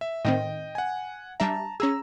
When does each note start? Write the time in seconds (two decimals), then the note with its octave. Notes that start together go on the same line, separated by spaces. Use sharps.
0.01 E5
0.25 A2 D#3 C4 D#5 G5
0.75 F#5 G#5
1.40 G3 D4 E5 A5 A#5
1.80 C#4 G#4 A#5 E6